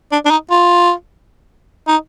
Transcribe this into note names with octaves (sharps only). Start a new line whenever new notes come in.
D4
D4
D#4
F4
D#4